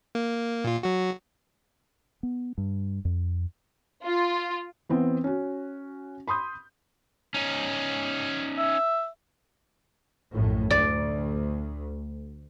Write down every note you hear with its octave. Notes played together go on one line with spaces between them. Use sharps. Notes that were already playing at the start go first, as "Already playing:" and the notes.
A#3
A#2 F4
F#3 F#4
B3
G2
F2
F4
E3 B3 C4
C#4 F#4
B5 C6 D#6 G6
C#4 D#4
E5
A#1 F#2 A2
D2 D5